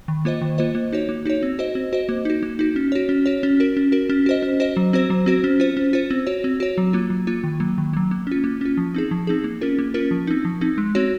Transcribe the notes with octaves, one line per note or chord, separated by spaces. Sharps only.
D#3
A#3 F4 C5 D#5
D#3
A#3 F4 C5 D#5
A#3
D#4 F#4 C#5
A#3
D#4 F#4 C#5
C4
F#4 C5 D#5
C4
F#4 C5 D#5
A#3
D#4 F#4
A#3
D#4 F#4
C#4
F#4 C#5
C#4
F#4 C#5
C#4
F#4 A#4
C#4
F#4 A#4
C#4
F#4 C5 D#5
C#4
F#4 C5 D#5
F#3
C4 F#4 C5
F#3
C4 F#4 C5
C#4
F4 C5
C#4
F4 C5
C4
F#4 C#5
C4
F#4 C#5
F#3
A#3 F4
F#3
A#3 F4
D#3
F#3 A#3
D#3
F#3 A#3
A#3
C#4 F4
A#3
C#4 F4
F3
C4 D#4 G#4
F3
C4 D#4 G#4
A#3
C#4 F4 A#4
A#3
C#4 F4 A#4
F3
C4 D#4
F3
C4 D#4
G#3
C4 F#4 C#5